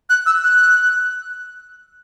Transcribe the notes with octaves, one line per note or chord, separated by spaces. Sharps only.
F#6
E6
F#6